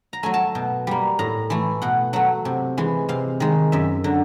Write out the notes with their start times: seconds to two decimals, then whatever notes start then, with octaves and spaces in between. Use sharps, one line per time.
0.13 A#5
0.23 F#3 A3 G#5
0.34 A5
0.55 B2
0.87 G3 A#3
1.19 A2 A#5
1.50 E3 A3
1.82 B2 F#5
2.13 F#3 A3 F#5
2.45 C3
2.78 E3 G#3
3.09 C3 F5
3.40 D#3 G#3
3.72 F#2 E5
4.04 D3 F#3